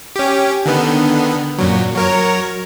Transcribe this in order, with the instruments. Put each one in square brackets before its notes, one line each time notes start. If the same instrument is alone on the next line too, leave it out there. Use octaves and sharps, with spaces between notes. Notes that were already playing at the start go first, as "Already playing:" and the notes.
[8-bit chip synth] C#4 G4
D3 D#3 B3
F#2 A#2 F#3
F#3 A#4 C#5